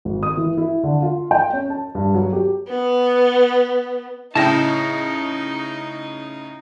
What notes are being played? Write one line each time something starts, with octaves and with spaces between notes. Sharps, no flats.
G#1
D#6
E3
E4
D3
F4
G5
C#4
A5
G2
F#3
G4
B3
A2 C#3 D#4 E4 D#5 G5 A5